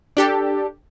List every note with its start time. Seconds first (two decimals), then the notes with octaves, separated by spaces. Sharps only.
0.17 D4 G4 A4